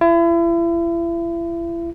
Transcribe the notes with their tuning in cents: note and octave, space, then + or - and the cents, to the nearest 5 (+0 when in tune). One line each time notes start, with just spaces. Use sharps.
E4 +35